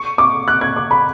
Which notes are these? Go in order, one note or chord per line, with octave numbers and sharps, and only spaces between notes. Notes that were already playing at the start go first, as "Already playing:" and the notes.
Already playing: C#6
D6
F#6
G#6
D6
B5